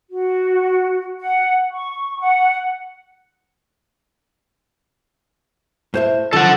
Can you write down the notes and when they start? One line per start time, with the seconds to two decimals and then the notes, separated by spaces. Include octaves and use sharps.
0.10 F#4
1.20 F#5
1.71 C#6
2.20 F#5
5.94 A2 C5 E5
6.33 F#2 D#3 F3 A4 F#5